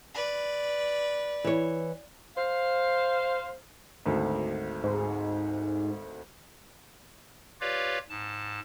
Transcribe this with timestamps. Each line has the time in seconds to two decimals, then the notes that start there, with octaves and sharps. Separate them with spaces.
0.15 B4 D5
1.44 E3 C#5
2.36 C5 F5
4.06 G#1 D2
4.84 G#2
7.61 F4 G4 B4 C#5 D5 F5
8.10 G#2 A5